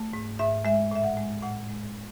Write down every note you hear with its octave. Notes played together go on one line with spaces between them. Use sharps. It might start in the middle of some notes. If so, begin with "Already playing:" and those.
Already playing: A3
G#2
G#2 E5
G#3 E5
A2 E5
F#5
G#3
A2 F#5
G#3
A2